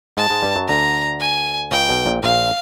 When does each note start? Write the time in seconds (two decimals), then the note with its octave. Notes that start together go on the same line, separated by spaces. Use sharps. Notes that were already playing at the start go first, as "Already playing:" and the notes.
0.17 G#2 G#3 A5
0.30 G#2 G#3
0.42 G2 G3
0.55 F#2 F#3
0.68 D2 D3 A#5
1.20 G#5
1.71 C#2 C#3 G5
1.89 B1 B2
2.06 A#1 A#2
2.23 A#1 A#2 F5